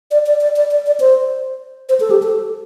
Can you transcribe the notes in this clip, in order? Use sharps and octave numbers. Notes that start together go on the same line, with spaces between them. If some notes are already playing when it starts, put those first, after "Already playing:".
D5
D5
D5
D5
D5
D5
C5
C5
A4
G4
A4